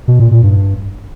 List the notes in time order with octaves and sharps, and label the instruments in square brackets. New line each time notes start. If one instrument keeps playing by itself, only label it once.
[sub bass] B2
A#2
A#2
G2